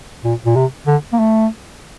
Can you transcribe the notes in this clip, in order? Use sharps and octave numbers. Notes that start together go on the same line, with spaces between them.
A#2
A#2
C3
D3
A#3
A3